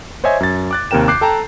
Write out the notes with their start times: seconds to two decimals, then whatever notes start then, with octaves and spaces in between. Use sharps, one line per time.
0.24 C5 C#5 D#5 E5 G#5 G#6
0.40 F#2 A6
0.71 D6 F#6 A6
0.91 D#2 C3 A#4 G5 E7
1.08 D6 F#6 G6 C7
1.21 A4 G5 A5 A#5